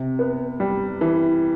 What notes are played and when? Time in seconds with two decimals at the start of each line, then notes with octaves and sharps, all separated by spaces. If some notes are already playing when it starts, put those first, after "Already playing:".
Already playing: C3
0.19 B3
0.60 G3
1.01 E3